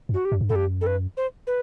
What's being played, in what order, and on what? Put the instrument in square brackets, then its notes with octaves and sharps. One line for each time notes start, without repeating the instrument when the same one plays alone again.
[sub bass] F#2
[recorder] F#4
G4
[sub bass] F#2
G2
[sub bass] F#2 [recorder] A4
[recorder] G4
A4
B4
C5
B4